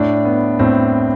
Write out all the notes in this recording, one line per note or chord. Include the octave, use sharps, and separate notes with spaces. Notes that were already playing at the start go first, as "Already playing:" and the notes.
Already playing: A2 D4
B3
A2 C4